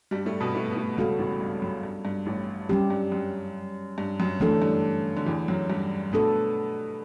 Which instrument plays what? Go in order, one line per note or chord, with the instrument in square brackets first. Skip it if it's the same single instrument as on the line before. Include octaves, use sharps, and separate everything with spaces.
[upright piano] G2 G3
A2 A3
B2 B3
A2 A3
B3
A2 A3
[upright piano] C#2 C#3 [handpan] G3 B3 F#4 A4
[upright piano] A1 A2
G2
F#2
G2
G2
A1 A2
[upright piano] F#2 [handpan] G3 C#4 G4
[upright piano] G2
F#2
G2
F#2
[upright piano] F#2 [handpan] E3 A3 D4 A4
[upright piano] G2
D3
E2 E3
F#2 F#3
G2 G3
[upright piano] B2 B3 [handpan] A3 D4 A4